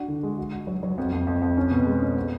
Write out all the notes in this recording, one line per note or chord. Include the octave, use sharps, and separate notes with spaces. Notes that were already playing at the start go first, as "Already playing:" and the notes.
Already playing: D4 F#4
D3
G#3
F#4
F#4
F#3
F#3
F2
F2
F2
F2
C#4
B2
G#3
C#4
B3